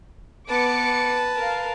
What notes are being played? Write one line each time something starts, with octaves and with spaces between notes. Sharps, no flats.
B3 B4 A5 D6 C#7
A#4 F5